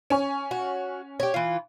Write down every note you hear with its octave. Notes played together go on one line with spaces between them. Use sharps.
C#4 G#5 C#6
F#4
G4 C#5
E3 F4